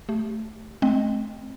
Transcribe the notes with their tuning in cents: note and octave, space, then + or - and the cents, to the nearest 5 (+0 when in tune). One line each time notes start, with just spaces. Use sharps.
A3 +0 G4 +0
A3 -40 C4 +0 D#5 +0